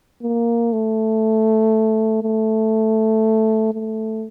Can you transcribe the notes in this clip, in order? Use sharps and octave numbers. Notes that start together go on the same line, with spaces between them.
A#3
A3
A3
A3